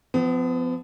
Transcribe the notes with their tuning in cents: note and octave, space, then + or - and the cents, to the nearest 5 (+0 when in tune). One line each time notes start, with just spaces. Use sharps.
F3 +0 B3 +40